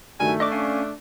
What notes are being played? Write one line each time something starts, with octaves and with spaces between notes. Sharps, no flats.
G2 D#3 F#3 A3 G#5
D4 D5 D#5 C#6 D6
C#4 F5 G#5